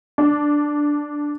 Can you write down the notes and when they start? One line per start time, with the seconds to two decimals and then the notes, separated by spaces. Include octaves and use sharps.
0.18 D4